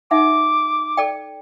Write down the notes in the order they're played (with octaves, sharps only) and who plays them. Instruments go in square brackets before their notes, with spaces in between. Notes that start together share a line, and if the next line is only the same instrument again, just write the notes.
[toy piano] D#4 E5 F#5 [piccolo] D6
[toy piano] A4 D5 G5